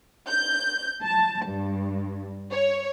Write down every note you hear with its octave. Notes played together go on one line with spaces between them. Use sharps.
G6
A5
G2
C#5